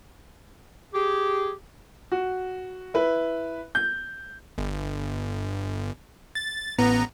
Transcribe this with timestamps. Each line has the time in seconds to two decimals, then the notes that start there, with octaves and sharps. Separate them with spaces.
0.94 G4 G#4
2.12 F#4
2.94 E4 B4
3.75 G6
4.58 G1
6.35 A6
6.79 A1 B3 A#5